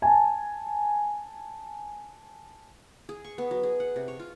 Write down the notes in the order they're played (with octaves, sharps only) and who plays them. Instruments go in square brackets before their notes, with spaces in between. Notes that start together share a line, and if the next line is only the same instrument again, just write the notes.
[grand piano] G#5 A5
[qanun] G#4
C#6
B3
F#3
G#4
F#5
C3
C#5
F4